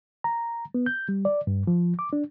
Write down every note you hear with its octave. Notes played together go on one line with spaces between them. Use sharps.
A#5
B3
G6
G3
D5
G2
F3
D6
D4